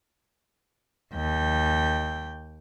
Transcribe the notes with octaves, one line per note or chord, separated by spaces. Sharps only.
D#2 G5